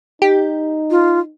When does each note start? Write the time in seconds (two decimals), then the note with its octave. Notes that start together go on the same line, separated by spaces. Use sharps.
0.22 D#4 G4
0.91 F4